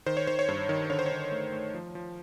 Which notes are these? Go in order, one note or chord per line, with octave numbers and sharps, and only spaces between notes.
D#3 C5
C#5
D#3 C5
C#5
G2 C5
D#3
D3 C#5
C5
C#5
D3
A3
A3
F3
F3